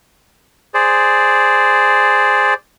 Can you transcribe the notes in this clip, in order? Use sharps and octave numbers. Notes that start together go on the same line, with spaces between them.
G#4 C5 D5